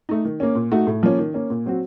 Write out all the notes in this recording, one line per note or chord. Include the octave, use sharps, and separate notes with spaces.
A3 D#4
D#3
A#3 C#4
A#2
A3 D#4 F#4
A2
F3 A#3 C#4
D#3
A#3 C#4
A#2
F#3 C4 F#4